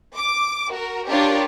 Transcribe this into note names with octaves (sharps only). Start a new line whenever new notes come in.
D6
F#4 A#4
D4 F4 G4 A#4 C#5 D5